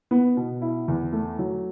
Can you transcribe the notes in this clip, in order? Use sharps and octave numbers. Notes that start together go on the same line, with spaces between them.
B3
B2
E4
E2
A3
F#3